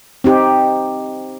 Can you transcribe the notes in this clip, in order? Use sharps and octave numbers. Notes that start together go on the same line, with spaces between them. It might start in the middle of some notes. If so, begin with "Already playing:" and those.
C4 D#4 G4